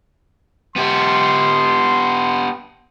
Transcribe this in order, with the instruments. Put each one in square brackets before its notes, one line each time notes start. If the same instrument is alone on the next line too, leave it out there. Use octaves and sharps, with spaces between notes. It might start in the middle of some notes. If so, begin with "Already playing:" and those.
[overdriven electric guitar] B3 G4 [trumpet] C6